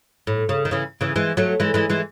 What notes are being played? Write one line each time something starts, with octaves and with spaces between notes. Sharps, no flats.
A2
C#3
D#3
C#3 E3
C#3 E3
E3 G#3
F#3 A3
E3 G#3
E3 G#3
E3 G#3